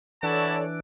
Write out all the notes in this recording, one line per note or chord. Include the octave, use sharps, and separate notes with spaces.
E3 D4 E4 F#4 A4 C#5 D5 A5